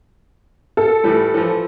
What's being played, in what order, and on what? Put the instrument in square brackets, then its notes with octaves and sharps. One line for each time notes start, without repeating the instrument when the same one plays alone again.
[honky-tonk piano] A4
[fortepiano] A2 E3 G3
E3 F3